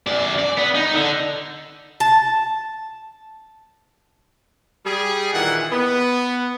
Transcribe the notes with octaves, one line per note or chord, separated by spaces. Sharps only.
F#2 D5
D5
B3
D#4
D3
A5
G3 G#4
A#2 D#3 E3 F#5
B3